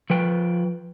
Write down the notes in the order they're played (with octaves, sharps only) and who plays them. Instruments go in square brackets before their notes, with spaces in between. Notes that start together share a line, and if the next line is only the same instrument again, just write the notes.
[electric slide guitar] F3 B4 G5